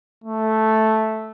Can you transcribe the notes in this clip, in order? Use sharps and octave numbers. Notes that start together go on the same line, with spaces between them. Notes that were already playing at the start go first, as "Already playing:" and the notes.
A3